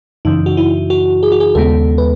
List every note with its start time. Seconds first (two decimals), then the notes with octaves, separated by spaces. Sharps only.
0.25 F#2 C#3 E3 D#4
0.46 F#4
0.57 E4
0.90 F#4
1.23 G#4
1.32 F#4
1.40 G#4
1.55 D#2 C#3 G#3 B3 A4
1.98 B4